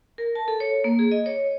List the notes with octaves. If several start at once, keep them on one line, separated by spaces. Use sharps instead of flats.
A#4
A5
A4
C#5
A#3
G#4
D#5
C#5